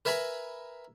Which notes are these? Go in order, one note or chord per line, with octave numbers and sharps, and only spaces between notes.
A#4 B4 E5 G#5 A#5 B5